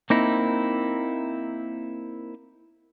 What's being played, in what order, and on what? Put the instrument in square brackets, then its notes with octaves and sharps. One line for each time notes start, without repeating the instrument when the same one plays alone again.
[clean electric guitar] A#3 C4 D#4 E4